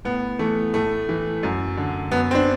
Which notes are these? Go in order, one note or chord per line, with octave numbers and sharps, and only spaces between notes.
A2 B3
E3 A3
A2 A3
E3
F#2
D3
F#2 B3
C4
D4